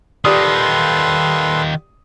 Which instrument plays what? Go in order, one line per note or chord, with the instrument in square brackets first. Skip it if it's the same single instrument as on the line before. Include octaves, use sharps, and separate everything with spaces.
[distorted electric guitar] D#3 F4 [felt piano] G4 D5 D#6 [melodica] A4 B4 C6